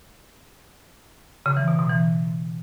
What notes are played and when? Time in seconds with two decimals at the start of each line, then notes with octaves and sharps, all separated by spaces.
1.46 C#3
1.57 E3
1.68 B2
1.79 B2
1.90 E3